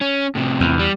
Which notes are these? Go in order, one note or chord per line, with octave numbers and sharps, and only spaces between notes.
C#4
A2 C3
E2
G3